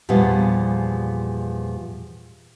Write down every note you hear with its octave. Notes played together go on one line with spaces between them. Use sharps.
E2 A#2 F3 G3 B3